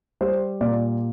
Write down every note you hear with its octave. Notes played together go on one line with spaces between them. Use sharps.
G3 C5
A#2 D5